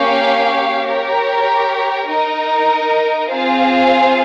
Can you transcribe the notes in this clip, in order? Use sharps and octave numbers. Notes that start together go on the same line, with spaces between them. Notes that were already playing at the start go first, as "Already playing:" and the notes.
Already playing: A#3 C#4 G4 C#5 F5
G4 A#4 C#5
D#4 A#4 D#5
C4 F4 G#4 C5 F5